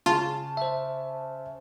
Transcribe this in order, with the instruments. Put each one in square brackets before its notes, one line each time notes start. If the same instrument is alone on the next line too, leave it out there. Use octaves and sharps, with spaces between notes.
[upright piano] C#3 A5 [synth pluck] F4
[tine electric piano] C5 E5